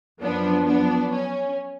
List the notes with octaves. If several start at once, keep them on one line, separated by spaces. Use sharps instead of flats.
F#2 F3 B3 D4
B3 D4
C#4